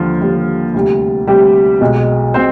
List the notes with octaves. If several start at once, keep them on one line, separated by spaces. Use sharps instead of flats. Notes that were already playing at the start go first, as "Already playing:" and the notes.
Already playing: D#2 D3 F3 G3 F4
D#2 D3 G3
D2 C3 G3
D2 C3 G3 G4
B1 B2 G#3
B2 C4 C5